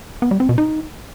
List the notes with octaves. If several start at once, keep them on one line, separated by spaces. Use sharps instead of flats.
B3
G3
C4
B2
D#4